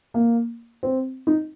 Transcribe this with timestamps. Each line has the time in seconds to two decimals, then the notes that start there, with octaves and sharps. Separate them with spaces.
0.14 A#3
0.83 C4
1.27 D#4